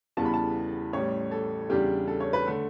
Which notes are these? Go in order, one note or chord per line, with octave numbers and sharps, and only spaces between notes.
E2 C#3 E3 G3 B3 A5
B5
A5
A1 A2 G3 C#5
A4
E2 C#3 G3 D4 G4
A4
C#5
B4
D3 A3